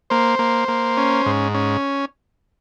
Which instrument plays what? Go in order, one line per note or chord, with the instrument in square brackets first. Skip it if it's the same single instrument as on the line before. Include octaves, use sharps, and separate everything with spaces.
[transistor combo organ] A#3 C5
A#3
A#3
C#4
G#2
C#4